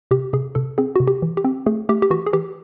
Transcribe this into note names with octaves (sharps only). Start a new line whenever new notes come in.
C3 G4
C3 G#4
C3 A4
C4 G#4
C3 F#4
G4
E3
G4
C4
A3 G#4
A3 G4
G4
E3 F#4
G#4
E3 G4